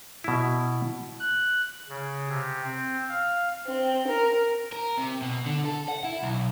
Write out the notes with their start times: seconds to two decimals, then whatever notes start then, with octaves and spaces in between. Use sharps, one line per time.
0.24 B2 E4
1.20 F#6
1.89 C#3
2.29 C3
2.64 C4
3.09 F5
3.66 C4
4.08 A#4
4.72 A#4
4.97 C3
5.22 B2
5.46 D3
5.65 A4
5.89 F#5
6.04 E4
6.22 B1